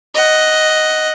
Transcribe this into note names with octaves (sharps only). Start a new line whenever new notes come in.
D#5 F#5